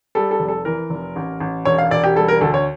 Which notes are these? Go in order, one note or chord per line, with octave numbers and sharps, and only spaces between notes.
G3 A4
A4
F1
A4
E3 A#4
F1
A1
A1
E1 C#5
F5
E1 D5
G4
G3 A4
A#4
D2 A4
C#5